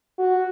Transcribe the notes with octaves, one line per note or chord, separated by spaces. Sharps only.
F#4